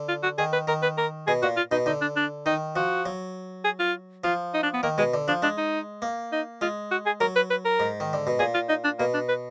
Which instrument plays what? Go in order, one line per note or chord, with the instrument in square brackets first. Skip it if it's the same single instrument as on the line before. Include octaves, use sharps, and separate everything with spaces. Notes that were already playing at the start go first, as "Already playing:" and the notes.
Already playing: [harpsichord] D3
[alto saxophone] F4
F#4
[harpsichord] D#3 [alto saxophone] G#4
[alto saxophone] B4
[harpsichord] D#3 [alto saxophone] A#4
[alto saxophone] B4
A#4
[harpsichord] B2 [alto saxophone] G#4
[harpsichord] A#2 [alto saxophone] F#4
[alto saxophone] F4
[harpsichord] B2 [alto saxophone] D#4
[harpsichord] D3 [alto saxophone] D#4
[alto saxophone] D4
D4
[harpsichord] D#3 [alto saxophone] D#4
[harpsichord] F3 [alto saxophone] F#4
[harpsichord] F#3
[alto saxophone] G#4
F4
[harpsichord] F3 [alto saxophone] F4
[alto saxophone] D#4
D4
B3
[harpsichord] D#3 [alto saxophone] A#3
[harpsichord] B2 [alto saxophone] G#3
[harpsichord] D3
[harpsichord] F3 [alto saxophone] D4
[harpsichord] G#3 [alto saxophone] D4
[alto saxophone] D#4
[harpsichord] A#3
[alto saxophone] D#4
[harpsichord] G#3 [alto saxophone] F4
[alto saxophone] F#4
G#4
[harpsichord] F#3 [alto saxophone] A#4
[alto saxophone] B4
B4
A#4
[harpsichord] G#2
D#3
D3
B2
[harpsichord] A#2 [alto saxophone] G#4
[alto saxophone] F4
D#4
D4
[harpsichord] B2 [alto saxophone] A#3
[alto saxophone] D4
B4